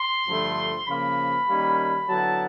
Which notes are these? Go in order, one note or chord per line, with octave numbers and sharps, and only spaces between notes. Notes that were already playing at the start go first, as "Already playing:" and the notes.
Already playing: C6
G2 D3 F3 A3
C#3 F3 A#3 B5
D#3 G3 A#3 C#4
D3 F#3 B3 E4 A5